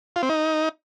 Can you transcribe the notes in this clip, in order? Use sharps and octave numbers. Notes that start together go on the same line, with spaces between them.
F4
C4
D#4